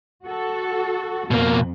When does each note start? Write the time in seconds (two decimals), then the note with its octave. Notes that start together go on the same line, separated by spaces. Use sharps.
0.25 F#4 A4
1.31 F2 B2 A#3